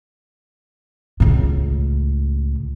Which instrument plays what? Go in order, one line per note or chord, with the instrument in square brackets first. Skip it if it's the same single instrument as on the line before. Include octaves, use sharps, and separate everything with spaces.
[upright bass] C#2 A2